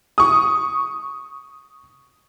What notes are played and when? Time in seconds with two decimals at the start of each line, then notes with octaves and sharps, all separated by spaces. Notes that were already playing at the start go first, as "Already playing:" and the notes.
0.18 C#6 D#6